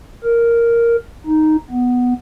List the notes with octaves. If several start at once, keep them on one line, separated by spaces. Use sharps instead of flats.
A#4
D#4
B3